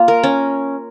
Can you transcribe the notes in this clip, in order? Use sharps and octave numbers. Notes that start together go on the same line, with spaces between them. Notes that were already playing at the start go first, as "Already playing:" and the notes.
Already playing: A#3 F4
A#4
C#4